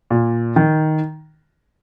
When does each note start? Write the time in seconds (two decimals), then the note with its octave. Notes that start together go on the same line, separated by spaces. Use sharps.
0.10 A#2
0.56 D#3